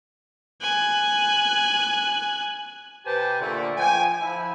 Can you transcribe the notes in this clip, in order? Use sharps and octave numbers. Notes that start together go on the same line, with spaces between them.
G#5 F#6
C3 G4 B4 C5 G#5 A5
A#2 D3 A3
F3 G5 G#5
F3 E4